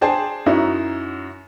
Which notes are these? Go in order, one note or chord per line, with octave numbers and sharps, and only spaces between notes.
D4 G#4 C5 G5 A5
F#2 D#4 E4 F#4